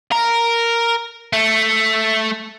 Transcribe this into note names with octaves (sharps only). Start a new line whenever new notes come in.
A#4
A3